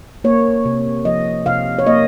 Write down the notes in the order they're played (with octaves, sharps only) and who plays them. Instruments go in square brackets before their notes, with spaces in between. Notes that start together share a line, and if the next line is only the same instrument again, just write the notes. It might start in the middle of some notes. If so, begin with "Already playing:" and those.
[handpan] A#3 C#5
C3
F3 D#5
C3 F5
C#5
A#3 D#5